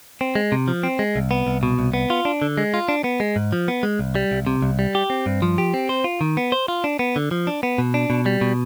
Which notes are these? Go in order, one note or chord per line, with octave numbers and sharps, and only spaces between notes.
C4
G#3
C3
F3
C4
G#3
C2
B3
C2
B2
C2
B3
F4
D4
D3
G#3
F4
D4
B3
G#3
G#2
F3
B3
G#3
C2
G3
C2
C3
C2
G3
G4
C4
G2
F3
G4
C4
C5
F4
D#3
B3
C5
F4
D4
B3
D3
F3
D4
B3
B2
D4
B2
G3
B2